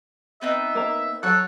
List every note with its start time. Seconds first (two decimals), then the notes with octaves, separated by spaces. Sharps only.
0.41 B3 C4 D#4 E5
0.75 A#3 A#5
1.23 F#3 A4 C#5 F#5